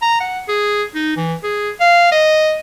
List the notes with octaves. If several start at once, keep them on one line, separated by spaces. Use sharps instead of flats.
A#5
F#5
G#4
D#4
E3
G#4
F5
D#5